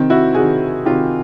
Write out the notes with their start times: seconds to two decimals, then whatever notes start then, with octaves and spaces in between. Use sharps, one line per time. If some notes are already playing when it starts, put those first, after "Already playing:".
Already playing: C3 D#3 C4
0.10 E4 F#4
0.34 C3 D#3 F#4 G#4
0.85 C3 D#3 F4 G4